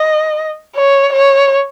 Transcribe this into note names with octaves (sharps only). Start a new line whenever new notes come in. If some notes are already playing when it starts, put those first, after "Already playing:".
Already playing: D#5
C#5
C#5